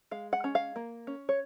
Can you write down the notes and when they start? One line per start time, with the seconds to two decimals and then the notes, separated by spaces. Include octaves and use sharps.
0.11 G#3 F5
0.33 F#5
0.44 C#4
0.55 F5
0.76 A#3
1.07 C#4
1.29 C#5